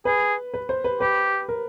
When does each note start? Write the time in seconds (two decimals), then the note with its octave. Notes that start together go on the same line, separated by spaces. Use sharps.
0.05 G#4 B4
0.54 B4
0.69 C5
0.84 B4
1.00 G4 B4
1.49 A#4